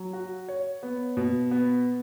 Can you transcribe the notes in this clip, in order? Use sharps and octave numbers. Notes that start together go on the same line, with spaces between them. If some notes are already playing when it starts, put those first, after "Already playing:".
Already playing: F#3
F#4
C#5
B3
B2
B3